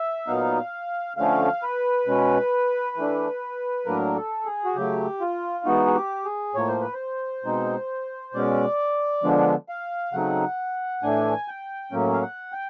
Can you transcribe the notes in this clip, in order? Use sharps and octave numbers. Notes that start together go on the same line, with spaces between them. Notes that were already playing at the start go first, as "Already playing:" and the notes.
Already playing: E5
A#2 F#3 B3 D#4 F5
D3 F3 A3 C#4 F5
B4
B2 G#3 C#4
E3 A3 D4
A2 F#3 A#3 D4 A#4
A4
G#4
F#4
C#3 F#3 A3 G4
F4
E3 G#3 B3 D#4 F#4
G#4
G4
G#4
A2 F3 A#3 C#5
C5
B4
C5
B2 G#3 C4 D#4
B2 G#3 C#4 D5
D3 F3 G#3 B3 D4
F5
C#3 F#3 A3 C4 D#4 F#5
A2 E3 A3 D4 G#5
G5
A2 F#3 A#3 C#4
F5
F#5
G5